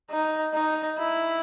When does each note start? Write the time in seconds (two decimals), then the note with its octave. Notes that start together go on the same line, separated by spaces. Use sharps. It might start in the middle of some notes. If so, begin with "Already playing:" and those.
0.10 D#4
0.54 D#4
0.98 E4